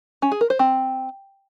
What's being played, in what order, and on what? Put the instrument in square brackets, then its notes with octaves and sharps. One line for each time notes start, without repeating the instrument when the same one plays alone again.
[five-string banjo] C#4
G#4
A#4
C5
C4